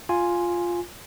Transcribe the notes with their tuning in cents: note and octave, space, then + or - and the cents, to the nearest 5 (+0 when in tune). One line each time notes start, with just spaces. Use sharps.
F4 +0 G#5 +0